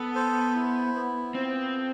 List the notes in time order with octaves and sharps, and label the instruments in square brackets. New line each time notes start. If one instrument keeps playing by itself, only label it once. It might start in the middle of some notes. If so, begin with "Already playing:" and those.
Already playing: [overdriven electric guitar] B3 [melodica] A4
[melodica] C5
E4
B3
[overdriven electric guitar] C4 [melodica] F4
[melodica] A4